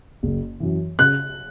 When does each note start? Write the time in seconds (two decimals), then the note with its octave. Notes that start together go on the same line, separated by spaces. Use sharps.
0.23 F#1
0.60 F#2 E3
0.99 C#3 F#6